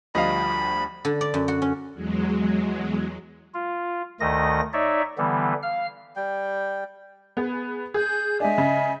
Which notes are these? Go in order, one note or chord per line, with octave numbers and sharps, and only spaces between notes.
D2 F3 G3 D#5 F5 B5
D3
D5
F#2
F#4
C#4
E2 F#3 G#3
F4
D2 D#3 A3 D#5 A#6
D#4 C#5 D5 E5
D3 E3 G3 B3
F5 F6
G3 G5
B3 G#4 B4
G#4 G6
G#3 D4 D#5 E5 G#5
C#3